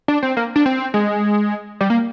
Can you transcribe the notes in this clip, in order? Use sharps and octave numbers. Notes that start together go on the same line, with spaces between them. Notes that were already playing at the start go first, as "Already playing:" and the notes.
D4
C4
A#3
D4
C4
G#3
G3
A#3